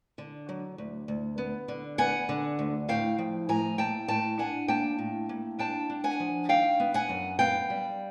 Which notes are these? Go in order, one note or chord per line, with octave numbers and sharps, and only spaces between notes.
D3
F#3
D2
D2
B3
D3
B3 F#5 G#5
D3
D2
A2 F5 G5
F3
A2 G#5 A#5
A#3 G5 A5
A2 G5 A5
D4 F#5 G#5
A#3 G5 A5
A2
A#3
D4 G5 A5
D4
F#5 G#5
F3
D#3 F5 G5
B3
F#5 G#5
F#2
B3 F5 G5
G3